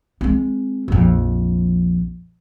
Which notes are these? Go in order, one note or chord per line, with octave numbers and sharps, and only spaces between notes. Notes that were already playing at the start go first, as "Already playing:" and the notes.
G#3 C4
A#1 F2